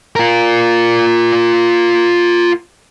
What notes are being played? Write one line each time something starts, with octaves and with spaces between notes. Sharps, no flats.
F4 A#4